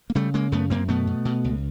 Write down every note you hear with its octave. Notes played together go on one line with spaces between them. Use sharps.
A#3
C#3 G3 A3
C#3 G#3 A#3
F#2 A3 B3
F#2 A#3 C4
B2 A3 B3
B2
B2
C#2